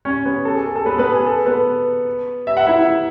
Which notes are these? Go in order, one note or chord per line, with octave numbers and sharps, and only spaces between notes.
C#4 C#5
B3 B4
A4
G#4
A4
A4
B3 B4
B3 B4
G#4
A4
B3 B4
E5
F#5
E4 E5